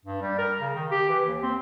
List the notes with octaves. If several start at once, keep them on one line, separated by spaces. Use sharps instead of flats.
G2
G3
A#4
C#3
D#3
G4
E3
D#2
C4